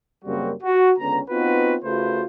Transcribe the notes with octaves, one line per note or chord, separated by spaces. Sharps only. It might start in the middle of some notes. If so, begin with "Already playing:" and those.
F#2 C#3 G3 A#3 C4 F#4
F#4
C#2 D3 B3 C#4 A#5
B3 C4 D#4 F4 F#4 B4
C#3 A3 F4 F#4 B4 C5